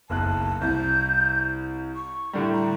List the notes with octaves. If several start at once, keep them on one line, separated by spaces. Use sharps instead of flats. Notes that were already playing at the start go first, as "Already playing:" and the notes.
F#1 B1 A5 F#6
C2 G6
C#6
A2 D3 G3
A#5